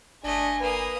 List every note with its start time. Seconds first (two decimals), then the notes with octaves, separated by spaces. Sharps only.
0.24 G1 A3 D4 D#5 G#5
0.60 A#3 B4 D#6